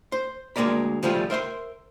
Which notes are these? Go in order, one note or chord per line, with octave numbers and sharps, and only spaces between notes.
C5
D2 G#3 A#3 A#4 D5 B5
C#3 F3 G3 A3 F4 G#4
A#4 C5 E5 F#5 C6